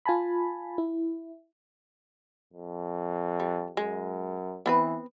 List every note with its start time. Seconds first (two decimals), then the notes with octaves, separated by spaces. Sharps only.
0.06 F4 G#5 A5 B5
0.78 E4
2.53 F2
3.40 G3
3.77 F#2 G#3
4.66 E3 B3 C4 B4